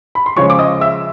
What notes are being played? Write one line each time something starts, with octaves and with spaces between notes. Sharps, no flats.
B5
C6
C#3 F3 G#3 C#5 C#6
D6
D#5 D#6
E5 E6